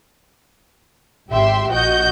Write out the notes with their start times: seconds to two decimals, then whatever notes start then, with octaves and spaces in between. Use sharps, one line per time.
1.30 G#1 G4 E5 G5 C6
1.71 A#1 F#4 D#5 G6